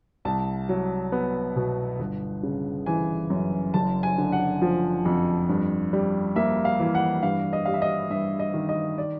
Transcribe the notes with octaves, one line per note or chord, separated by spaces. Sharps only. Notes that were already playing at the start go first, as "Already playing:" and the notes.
C2 A5
F#3
B3
B2
G1
C#3
E3 G#5
F#2
F#1 A5
G#5
D3
F#5
F3
F2
G2
G3
A#3 E5
F5
E3
F#5
G2 F5
D#5
G3 F5
E5
D#5
G2 E5
D#5
D#3
D#5
D5